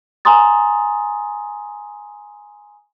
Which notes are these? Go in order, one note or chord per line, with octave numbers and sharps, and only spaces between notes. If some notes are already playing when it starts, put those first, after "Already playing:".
G#5 A#5 C6 D#6 A6